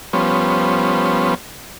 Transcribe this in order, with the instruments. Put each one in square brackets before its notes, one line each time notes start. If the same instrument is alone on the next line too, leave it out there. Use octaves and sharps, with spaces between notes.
[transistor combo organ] F3 G3 B3 C#4 C5